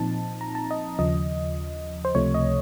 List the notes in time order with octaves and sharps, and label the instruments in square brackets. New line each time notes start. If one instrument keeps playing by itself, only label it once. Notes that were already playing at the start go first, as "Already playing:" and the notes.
Already playing: [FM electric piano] A#2 F3 C4 D#4 A5
A#5
A5
D#5
D#2 C#3 F3 D#5
C5
C#2 C3 F3 A3 C#5
D#5